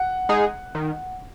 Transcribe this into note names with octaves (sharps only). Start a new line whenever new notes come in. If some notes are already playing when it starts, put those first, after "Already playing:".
Already playing: F#5
G#3 D#4 G#4
D#3